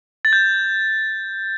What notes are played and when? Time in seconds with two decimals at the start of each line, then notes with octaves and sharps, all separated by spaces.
0.25 A6
0.33 G6